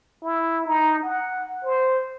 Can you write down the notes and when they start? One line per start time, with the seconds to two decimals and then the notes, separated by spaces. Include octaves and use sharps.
0.22 E4
0.67 D#4
1.03 F#5
1.64 C5